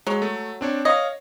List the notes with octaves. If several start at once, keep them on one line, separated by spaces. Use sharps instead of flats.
F#3 G#3
A3
C4 D4 C#5
C#5 D#5 F5